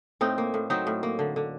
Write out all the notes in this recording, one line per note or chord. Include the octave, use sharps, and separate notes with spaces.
A2 C4 D#4
A#3
A2
F#3 C4 D#4
A2
A#3
D3
D3